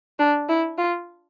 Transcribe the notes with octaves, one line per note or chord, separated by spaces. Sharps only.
D4
E4
F4